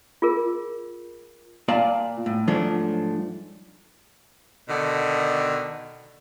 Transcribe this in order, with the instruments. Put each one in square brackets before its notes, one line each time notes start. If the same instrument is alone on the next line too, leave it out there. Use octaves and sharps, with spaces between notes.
[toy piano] F4 G#4 A#4
[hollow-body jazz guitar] A#2 D5 F5 A5
A2
G#2 F3 F#3 A3 D4
[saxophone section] B2 D3 D#3